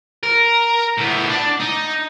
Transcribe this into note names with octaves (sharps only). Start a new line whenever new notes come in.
A#4
A2 B3
D4
D#4